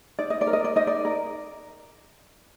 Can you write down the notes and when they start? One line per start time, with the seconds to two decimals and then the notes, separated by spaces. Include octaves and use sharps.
0.19 D#4 D5
0.30 D#5
0.41 D5
0.47 A#4
0.53 D#5
0.64 D5
0.76 D#4 D#5
0.87 D5
1.05 A#4